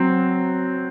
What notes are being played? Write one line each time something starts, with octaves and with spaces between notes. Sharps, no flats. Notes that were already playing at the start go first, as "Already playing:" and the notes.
Already playing: F#3 C4